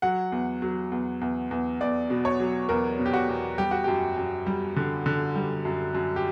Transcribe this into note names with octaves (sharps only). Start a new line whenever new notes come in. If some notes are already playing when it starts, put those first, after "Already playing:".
F#3 F#5
E2
F#3
E2
E2
E2
E2 D5
B2
C#5
F#3
E2 A#4
B2
G4
F#4
E2
G3 G4
F#4
F#2 G4
F#2
G3
D3
D3
G3
F#2
F#2
G4